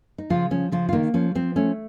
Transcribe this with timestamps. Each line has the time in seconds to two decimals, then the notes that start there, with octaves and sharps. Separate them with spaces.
0.18 D#4
0.30 C#3 F3 F4
0.51 F3 C#4
0.72 C#3 F3 F4
0.89 F4
0.93 D#3 A#3 D#4
1.14 F3 C#4
1.35 F3 C4
1.56 A3 C#4